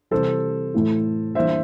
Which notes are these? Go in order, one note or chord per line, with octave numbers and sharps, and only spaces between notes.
C3 E3 G3 A4 C5
A2 E3 A3 E4
E3 G3 A#3 D4 C5 E5